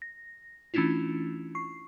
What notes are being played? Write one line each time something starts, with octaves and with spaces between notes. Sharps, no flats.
A#6
E3 A3 C#4 D4 E4 F4
C#6 C7